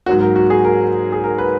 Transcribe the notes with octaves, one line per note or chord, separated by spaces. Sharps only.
G#2 F#3 A#3 F#4
A#4
F#4
G#4
A#4
G#4
A#4
B4